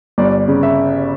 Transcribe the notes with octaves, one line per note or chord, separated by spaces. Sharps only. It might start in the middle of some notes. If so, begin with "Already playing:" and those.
G1 D5
C#3
E5